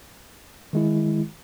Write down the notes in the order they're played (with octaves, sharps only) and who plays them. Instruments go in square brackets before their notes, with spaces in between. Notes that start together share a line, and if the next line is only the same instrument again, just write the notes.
[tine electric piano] D#3 G#3 E4